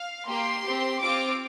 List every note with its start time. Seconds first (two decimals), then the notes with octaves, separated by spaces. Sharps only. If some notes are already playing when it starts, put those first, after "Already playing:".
Already playing: F5
0.26 A#3 G4 C6
0.63 C4 G4
1.00 C4 F4 D6